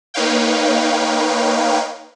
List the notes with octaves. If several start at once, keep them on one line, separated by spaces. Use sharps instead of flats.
A#3 D#4 B4 C#5 F5 G5